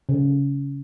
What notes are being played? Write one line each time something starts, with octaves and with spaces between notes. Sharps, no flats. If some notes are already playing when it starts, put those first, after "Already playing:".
C#3